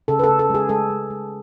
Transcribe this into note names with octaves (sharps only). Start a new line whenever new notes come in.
C#3 A4
B4
A4
C#3
A4
G#3 G#4
G#3 A4
G#3
G#3